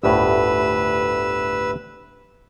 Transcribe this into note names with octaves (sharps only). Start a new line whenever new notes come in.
G1 D2 A2 B4 E6